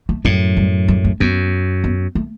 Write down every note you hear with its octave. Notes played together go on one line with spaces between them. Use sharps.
A3
F#2 A2 G3
G3
G3
A3
F#2 B3
B3
A3